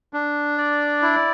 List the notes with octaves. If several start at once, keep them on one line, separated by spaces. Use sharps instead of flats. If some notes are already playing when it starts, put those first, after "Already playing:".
D4
D5
E4